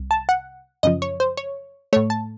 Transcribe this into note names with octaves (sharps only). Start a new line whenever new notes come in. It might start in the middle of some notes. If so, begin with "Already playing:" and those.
Already playing: C2
A5
F#5
F#2 C#3 F3 D#5
C#5
C5
C#5
A2 A3 C#5
A5